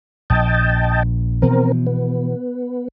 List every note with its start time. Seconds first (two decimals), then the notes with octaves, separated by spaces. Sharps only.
0.30 A#1 D#5 G5 A5
1.42 B2 E3 F3 C4 A#4
1.87 B3